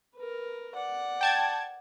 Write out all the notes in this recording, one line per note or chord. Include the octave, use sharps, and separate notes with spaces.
A#4 B4
D5 F#5
G5 A5 G#6